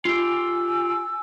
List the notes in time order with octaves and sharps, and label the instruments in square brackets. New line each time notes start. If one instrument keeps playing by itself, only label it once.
[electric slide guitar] F4 G4 [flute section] G#5 E6